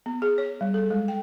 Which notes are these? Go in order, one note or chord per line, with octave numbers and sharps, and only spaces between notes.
B3
G#4
C#5
G3
A4
G#3
G5